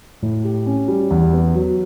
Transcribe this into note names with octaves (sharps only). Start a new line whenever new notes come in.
A2
G4
C#4
G3
E2
B3
F#3